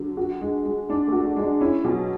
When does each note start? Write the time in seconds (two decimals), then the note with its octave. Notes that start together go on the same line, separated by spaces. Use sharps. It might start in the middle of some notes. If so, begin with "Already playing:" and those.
Already playing: D3 F#3
0.17 F#4
0.41 G#3
0.66 G#3
0.89 G#3 D4
1.07 A3 F#4
1.24 D4
1.37 G#3
1.43 D4
1.61 C#4 E4
1.84 B2 F#3